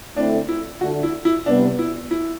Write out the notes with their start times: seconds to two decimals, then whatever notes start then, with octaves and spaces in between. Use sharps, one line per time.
0.16 D3 A3 C4 D4 E4
0.48 E4
0.81 D3 A3 D4 F#4
1.03 E4
1.25 E4
1.46 C3 G3 B3 D4
1.79 E4
2.11 E4